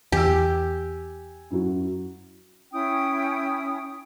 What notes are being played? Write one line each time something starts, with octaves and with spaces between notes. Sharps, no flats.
E2 G4 G#5 E6
F#2 E4 F#4
C#4 E4 G5 D#6